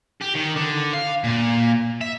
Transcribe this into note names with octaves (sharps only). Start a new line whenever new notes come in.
G4
D#3
D3
F5
A#2
E5